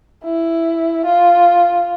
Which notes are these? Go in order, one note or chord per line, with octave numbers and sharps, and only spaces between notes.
E4
F4